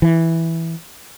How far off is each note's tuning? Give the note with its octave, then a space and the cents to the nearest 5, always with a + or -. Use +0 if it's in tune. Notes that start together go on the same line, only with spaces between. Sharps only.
E3 -5